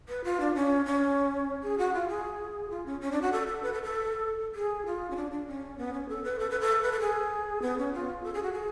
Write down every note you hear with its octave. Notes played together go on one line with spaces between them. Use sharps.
B4
F4
D4
C#4
C#4
G#4
F#4
F4
G#4
F4
C#4
C#4
D4
F#4
A4
A4
B4
A4
A4
G#4
F4
C#4
D4
D4
C#4
B3
C#4
A4
B4
A4
B4
A4
B4
A4
G#4
B3
C#4
F4
A4
G#4
F#4
G#4